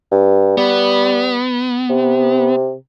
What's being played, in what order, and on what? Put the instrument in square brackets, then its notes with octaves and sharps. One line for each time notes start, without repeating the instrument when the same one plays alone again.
[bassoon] G2
[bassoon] G3 [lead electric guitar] B3
[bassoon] C3